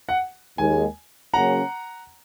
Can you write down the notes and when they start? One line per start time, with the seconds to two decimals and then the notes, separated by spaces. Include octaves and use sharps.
0.09 F#5
0.58 D#2 D#3 G#3 G#5
1.34 C#3 F#3 A#3 C#4 F#5 A#5